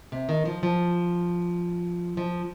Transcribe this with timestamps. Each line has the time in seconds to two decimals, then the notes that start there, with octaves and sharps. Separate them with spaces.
0.12 C3
0.29 D#3
0.45 F3
0.63 F3
2.17 F3